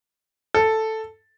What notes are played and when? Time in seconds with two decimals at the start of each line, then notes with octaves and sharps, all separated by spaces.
0.55 A4